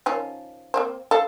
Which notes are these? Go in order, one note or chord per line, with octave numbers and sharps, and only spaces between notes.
D#3 F3 C#4
A#3 C4 C5
A4 F5